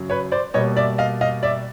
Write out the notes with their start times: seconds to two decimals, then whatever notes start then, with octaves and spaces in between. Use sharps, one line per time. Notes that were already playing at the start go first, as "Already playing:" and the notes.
Already playing: F#2 C#3 F#3
0.10 B4 C#5
0.32 C5 D5
0.54 B2 G3 A#3 C#5 D#5
0.76 D5 E5
0.98 D#5 F5
1.21 D#5 F5
1.43 D5 E5